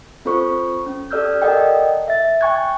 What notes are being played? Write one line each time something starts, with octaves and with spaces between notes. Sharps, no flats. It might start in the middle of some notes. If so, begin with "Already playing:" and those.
C4 F4 A4 C5 C#6
C#4
G4 A4 D5 E6 F6 G6
A4 A#4 D5 D#5 F#5 G5
E5 A6
G5 G#5 C#6 F#6 G#6